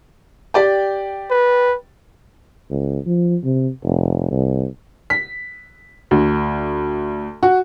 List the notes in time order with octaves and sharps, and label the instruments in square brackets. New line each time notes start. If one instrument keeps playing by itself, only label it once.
[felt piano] G4 D5 G5
[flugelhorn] B4
[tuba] C#2
F3
C3
F1
C2
[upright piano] B6
D2
F#4